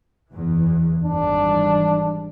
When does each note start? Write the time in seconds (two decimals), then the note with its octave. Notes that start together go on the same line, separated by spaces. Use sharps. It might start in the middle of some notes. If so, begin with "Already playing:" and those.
0.31 F#1 E2 E3
1.04 G#1 E3 G3 D4